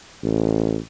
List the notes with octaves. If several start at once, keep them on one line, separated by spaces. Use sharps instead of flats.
A1